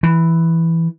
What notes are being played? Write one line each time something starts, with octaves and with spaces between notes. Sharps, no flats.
E3